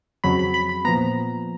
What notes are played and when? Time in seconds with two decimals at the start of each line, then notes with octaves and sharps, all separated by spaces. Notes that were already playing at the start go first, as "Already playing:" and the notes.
0.24 F2 C#3 F#3 B5
0.39 B5
0.54 B5
0.69 B5
0.85 A#2 F3 B3 A#5